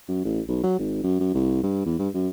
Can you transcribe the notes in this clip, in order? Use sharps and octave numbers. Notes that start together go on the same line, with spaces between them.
F#2
A1
B1
F#3
G#1
F#2
F#2
C2
G2
E2
G2
F#2